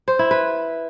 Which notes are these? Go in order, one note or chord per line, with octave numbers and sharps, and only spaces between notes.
C5
E4
B4